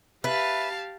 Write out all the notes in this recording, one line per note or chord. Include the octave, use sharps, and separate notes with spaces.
G4 B4 E5 F5 A5